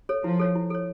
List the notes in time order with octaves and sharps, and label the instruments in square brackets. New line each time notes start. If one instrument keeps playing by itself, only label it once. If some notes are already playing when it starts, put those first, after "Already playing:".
[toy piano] A4 C#5
[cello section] F3 [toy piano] E4
[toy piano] A4 C#5
E4
A4 C#5